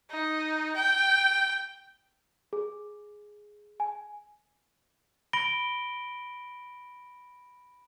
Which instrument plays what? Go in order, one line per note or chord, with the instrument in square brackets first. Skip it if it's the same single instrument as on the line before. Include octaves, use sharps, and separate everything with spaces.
[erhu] D#4
G5
[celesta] G#4
G#5
[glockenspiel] B5 A#6 D7 G7